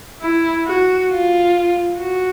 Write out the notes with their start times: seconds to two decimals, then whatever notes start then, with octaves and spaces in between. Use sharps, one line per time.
0.22 E4
0.66 F#4
1.11 F4
1.98 F#4